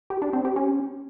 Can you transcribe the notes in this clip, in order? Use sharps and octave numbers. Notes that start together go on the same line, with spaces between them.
G4
D4
C4
G4
C#4